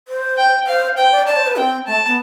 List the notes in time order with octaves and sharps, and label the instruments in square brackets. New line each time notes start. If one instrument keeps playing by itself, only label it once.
[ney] C5
[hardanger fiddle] G5
[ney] C5 [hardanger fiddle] F5
[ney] C5 [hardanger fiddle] G5
[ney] D5
[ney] D5 [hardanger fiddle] A5
[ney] C5
B4
[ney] C4 [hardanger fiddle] G5
[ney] A3 [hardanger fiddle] A5
[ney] B3